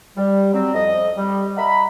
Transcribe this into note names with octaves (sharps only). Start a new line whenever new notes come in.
G3
F#3 C4
F2 D#5
G3
D#5 E5 F#5 A#5 B5